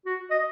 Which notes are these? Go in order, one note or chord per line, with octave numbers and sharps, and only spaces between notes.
F#4
D#5